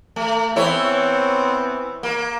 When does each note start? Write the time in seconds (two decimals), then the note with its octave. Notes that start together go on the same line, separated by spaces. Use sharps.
0.16 A3
0.56 E3 B3 C4 E4 C#5
2.03 A#3